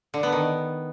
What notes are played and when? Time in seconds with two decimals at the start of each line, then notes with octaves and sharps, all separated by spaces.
0.14 D3
0.23 B3
0.33 D#3